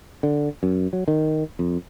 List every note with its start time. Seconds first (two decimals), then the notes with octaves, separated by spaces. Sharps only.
0.23 D3
0.63 F#2
0.93 F#3
1.08 D#3
1.59 F2